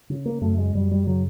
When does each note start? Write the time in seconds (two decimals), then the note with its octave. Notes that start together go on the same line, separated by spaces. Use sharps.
0.10 C#3
0.26 A#3
0.41 F#2 A3
0.58 G#3
0.75 F#2 G3
0.91 G3
1.07 C#3 F#3